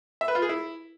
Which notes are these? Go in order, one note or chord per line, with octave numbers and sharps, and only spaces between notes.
E5
B4
F4
G#4
E4